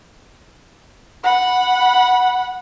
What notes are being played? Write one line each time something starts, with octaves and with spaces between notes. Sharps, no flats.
F#5 B5